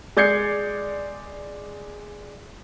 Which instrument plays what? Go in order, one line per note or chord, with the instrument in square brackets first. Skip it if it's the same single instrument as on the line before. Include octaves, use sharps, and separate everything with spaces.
[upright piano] G#3 D5 G6 G#6 C7 C#7